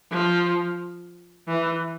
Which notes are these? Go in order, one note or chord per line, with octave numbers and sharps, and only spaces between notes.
F3
E3